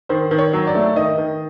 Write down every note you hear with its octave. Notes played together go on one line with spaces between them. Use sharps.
D#3 C5
D#3
C#5
F#3
D5
A3
D#3 D#5
D#3